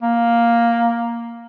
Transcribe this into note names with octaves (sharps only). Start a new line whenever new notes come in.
A#3